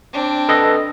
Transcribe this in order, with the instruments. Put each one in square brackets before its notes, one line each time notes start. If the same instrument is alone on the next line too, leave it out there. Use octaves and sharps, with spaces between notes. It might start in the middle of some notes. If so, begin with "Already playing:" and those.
[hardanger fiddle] C4 D4
[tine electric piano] A4 B4 D#5